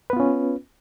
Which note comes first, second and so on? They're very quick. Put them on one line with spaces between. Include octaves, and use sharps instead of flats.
B4 B3 F4 C#4